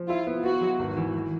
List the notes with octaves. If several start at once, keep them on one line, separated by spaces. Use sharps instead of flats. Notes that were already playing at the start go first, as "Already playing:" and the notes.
Already playing: F3
E4 F4
B3
B3 F#4
F#3
G#1
E3
E3